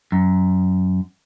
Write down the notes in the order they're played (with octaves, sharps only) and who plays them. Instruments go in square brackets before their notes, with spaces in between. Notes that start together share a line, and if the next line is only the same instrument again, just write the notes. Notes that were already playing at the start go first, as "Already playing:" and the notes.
[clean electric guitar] F#2